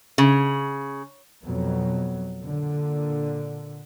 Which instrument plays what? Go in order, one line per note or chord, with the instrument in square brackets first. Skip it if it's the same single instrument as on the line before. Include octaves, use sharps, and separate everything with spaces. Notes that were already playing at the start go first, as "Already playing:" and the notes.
[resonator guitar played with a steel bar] C#3
[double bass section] F2 B2 F#3
A#2 D3